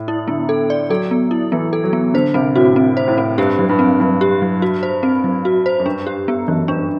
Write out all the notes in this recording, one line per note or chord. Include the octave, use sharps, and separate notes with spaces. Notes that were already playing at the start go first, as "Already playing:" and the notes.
Already playing: A2
E4
D3 B3
A4
D5
F#3 A4
B3
E4
E3 B3
A4
F#3
B3
D3 C5
C3 C4
A2 F#4
C4
C5
A2
C4
G2 G4
F#3
G2
C4
G2 F#3
G4
F#3
F#4
C5
C4
F#3
F#4
C5
F#2
G2 D4
G4
B3
F#2 E3
G2 D4